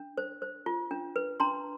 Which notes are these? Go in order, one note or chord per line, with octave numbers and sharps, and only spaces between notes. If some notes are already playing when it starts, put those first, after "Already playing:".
Already playing: D4
C5
C5
F4
D4
B4
D4 A#5 C6